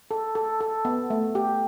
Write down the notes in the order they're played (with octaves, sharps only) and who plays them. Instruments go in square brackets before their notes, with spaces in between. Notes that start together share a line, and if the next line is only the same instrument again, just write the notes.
[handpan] A4
A4
A4
B3
A3
G4